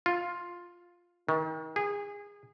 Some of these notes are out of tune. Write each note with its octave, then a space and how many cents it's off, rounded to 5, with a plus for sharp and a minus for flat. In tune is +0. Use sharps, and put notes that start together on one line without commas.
F4 +5
D#3 +35
G#4 -25